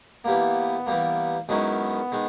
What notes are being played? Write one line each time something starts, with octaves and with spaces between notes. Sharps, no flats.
E3 G3 A#3 B3
E3 G3 A#3
F#2 D#3 G#3 B3 C#4 E4
D#3 G#3